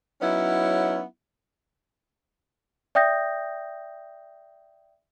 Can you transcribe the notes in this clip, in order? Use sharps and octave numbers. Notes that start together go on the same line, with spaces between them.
F#3 B3 C#4 D#4 E4
D5 E5 G5 D#6 G6 A#6